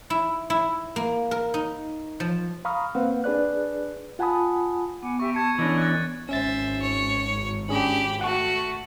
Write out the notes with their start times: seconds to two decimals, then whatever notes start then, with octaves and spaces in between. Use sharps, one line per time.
0.10 E4
0.50 E4
0.96 A#3
1.31 A#4
1.54 D#4
2.20 F3
2.65 F5 A#5 B5 C#6 D#6 F6
2.95 A#3 C4 B4 C5 F5 F#5
3.24 D4 G#4 B4 D5 F#6
4.19 F4 F#5 G#5 A5 B5 D#6
5.03 B3 F#5 G#5 D6
5.19 G4 E5 C#6
5.35 A5 C#6 G#6 C#7
5.59 E3 C#4 D4 D#5
5.78 F#6 A6
6.29 G#1 C#4 C5 E5 A6
6.81 C#5
7.69 C#4 D4 G4 G#4 B5
8.21 A3 F#4 F#5 C#6